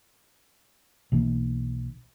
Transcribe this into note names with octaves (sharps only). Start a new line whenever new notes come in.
B1 E3 A#3